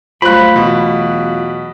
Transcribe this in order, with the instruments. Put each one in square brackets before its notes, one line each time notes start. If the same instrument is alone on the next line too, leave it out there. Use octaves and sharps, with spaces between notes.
[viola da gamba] F#3 G3 A3 [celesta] F4 F5 [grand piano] C5 F#6 [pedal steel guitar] B5
[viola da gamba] E2 F#3 [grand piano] B2